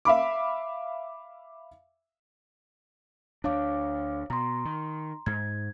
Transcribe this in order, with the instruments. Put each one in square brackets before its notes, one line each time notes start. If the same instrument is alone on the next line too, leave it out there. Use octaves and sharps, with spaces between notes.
[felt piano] E5 F5 B5 D6
[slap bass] D2 D4 [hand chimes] C#5 F5 D6
[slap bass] B2 [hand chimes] A#5 C6
[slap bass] D#3
[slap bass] G#2 [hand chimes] G#6